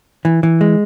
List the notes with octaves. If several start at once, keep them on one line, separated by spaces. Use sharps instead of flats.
E3
E3
G#3